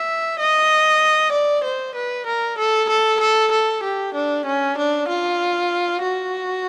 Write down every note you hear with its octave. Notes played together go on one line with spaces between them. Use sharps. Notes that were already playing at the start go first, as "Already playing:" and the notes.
Already playing: E5
D#5
D5
C5
B4
A#4
A4
A4
A4
A4
G4
D4
C#4
D4
F4
F#4